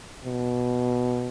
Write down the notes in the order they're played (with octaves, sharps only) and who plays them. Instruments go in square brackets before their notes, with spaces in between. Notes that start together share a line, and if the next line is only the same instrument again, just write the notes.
[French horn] B2